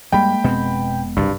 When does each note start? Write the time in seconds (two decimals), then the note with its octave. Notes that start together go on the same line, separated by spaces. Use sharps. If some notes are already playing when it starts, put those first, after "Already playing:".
0.12 G2 G3 G#3 A#3 G5 B5
0.44 F1 B2 G#3 B3 C4
1.17 F#1 C2 G2